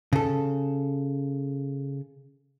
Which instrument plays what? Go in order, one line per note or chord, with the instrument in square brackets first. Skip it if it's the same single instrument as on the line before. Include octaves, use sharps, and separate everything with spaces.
[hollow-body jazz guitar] C#3 A4